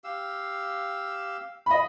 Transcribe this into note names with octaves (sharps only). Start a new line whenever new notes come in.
G4 F5 E6
D#5 B5